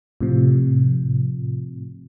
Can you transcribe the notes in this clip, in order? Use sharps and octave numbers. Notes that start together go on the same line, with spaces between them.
A2 C3 F3